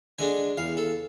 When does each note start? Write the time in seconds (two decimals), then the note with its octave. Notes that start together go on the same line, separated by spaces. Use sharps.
0.19 D3 G#3 D4 G#5
0.57 E2 F5
0.77 A4